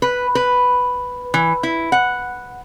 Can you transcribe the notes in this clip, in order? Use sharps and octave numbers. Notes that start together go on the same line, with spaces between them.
B4
B4
E3
E4
F#5